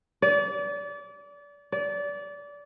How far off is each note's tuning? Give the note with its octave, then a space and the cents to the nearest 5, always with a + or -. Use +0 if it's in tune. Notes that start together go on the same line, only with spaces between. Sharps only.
D5 -30
D5 -25